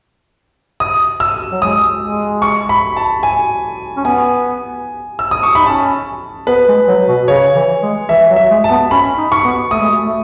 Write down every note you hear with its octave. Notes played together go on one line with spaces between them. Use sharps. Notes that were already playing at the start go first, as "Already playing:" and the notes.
D#6
E6
F#3
G#3 D#6
G#3
C#6
B5
A5
G#5
C#4
B3 G#5
E6
D#6
C#6
D#4 B5
C#4 A5
B3 B4
G#3
F#3
B2
C#3 C#5
E3
G#3
E3 E5
F#3
E5
G#3
A5
B3
C#4 B5
D#4
C#6
B3
A3 D#6
G#3
A3
A3